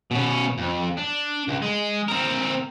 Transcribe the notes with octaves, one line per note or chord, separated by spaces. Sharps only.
B2 C#4
F2
D4
C#2
G#3
C4 A#4